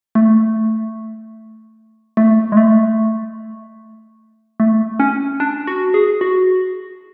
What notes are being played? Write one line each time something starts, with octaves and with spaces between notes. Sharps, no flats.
A3
A3
G#3
A3
A3
C#4
D4
F#4
G#4
F#4